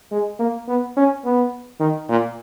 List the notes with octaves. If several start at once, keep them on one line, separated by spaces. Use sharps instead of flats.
G#3
A#3
B3
C#4
B3
D#3
A#2